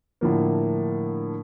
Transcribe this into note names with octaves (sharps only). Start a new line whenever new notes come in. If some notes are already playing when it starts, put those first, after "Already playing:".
A2 D3 F3 A#3